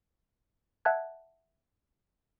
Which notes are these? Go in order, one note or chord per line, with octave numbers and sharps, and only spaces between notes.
E5 F#5 A5 F#6 G#6